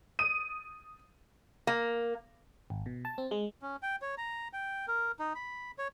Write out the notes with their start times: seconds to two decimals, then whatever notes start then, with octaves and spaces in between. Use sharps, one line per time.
0.19 D#6 D#7
1.67 A#3
2.70 G#1
2.86 B2
3.05 A5
3.18 C4
3.31 G#3
3.62 C#4
3.82 G5
4.02 C#5
4.18 A#5
4.53 G5
4.88 A#4
5.19 D#4
5.35 B5
5.78 C#5